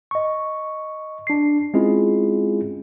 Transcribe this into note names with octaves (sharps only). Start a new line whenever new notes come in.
D#5 C#6
D4 C7
G#3 C4 C#4 E4 F4 G#4